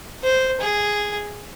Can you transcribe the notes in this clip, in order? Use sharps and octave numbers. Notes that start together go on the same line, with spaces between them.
C5
G#4